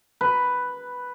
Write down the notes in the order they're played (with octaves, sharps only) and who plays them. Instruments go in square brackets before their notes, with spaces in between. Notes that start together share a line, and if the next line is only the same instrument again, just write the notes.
[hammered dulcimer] B4